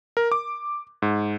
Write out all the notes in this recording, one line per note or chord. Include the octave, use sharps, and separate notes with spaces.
A#4
D6
G#2